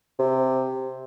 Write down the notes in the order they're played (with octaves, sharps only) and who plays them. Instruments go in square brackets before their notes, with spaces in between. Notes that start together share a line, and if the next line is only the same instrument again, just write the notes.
[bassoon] C3